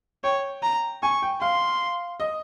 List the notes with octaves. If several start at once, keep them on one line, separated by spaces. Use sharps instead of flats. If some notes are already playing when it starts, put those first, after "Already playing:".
C#5 G5
A#5
G#5 C#6
G5
F5 C6
D#5